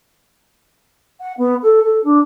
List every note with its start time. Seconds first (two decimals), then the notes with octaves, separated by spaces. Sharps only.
1.20 F#5
1.37 B3
1.62 A4
1.83 A4
2.04 D4